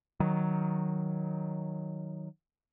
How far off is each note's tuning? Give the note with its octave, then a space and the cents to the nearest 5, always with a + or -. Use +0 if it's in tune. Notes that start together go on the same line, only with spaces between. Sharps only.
D#3 +5 F#3 +0